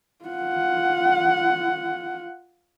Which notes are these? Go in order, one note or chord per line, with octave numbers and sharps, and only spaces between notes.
F4 F#5